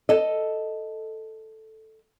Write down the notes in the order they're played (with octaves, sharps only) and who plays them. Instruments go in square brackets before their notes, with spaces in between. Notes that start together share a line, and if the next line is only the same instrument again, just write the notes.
[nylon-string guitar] A4 D#5